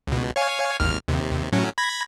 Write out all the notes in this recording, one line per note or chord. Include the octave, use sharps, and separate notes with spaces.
C#2 B2
C#5 F5 G#5
G#1 D#2 F6
D#2 C3
A2 F#3 C#4
B5 G#6 A#6